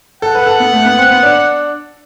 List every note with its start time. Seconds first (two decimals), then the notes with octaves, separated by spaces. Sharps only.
0.22 A4 F#5
0.35 B4
0.47 A4
0.60 B3
0.73 A3
0.85 B3
0.98 C4
1.11 B3
1.23 D4